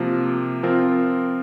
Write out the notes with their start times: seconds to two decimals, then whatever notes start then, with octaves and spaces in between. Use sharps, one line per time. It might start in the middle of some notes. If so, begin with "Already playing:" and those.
Already playing: C3 F3 A#3 F4 A#4
0.63 F3 C4 F4 A#4